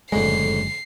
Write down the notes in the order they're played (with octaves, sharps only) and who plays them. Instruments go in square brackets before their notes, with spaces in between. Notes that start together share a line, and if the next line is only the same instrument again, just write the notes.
[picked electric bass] F#1 G#3 [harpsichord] F2 A2 D3 [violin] C7